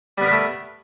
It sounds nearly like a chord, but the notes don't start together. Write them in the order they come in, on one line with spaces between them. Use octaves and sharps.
G3 B3 A#4 B4 A3